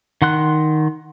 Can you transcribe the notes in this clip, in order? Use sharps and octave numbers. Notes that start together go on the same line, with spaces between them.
D#3 F#5 C6 F#6